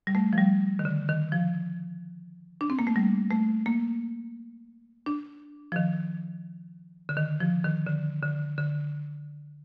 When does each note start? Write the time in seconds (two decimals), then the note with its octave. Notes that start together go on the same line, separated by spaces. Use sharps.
0.07 G3
0.15 A3
0.33 F3
0.38 G3
0.79 D#3
0.85 D3
1.09 D#3
1.32 F3
2.61 D4
2.70 C4
2.79 A#3
2.87 A3
2.96 G3
3.30 A3
3.66 A#3
5.06 D4
5.72 F3
5.76 D#3
7.09 D3
7.17 D#3
7.40 F3
7.64 D#3
7.87 D3
8.23 D3
8.58 D3